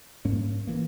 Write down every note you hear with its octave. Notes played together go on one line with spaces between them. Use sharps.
G#2 G3 A#3 C#4
E3 A#3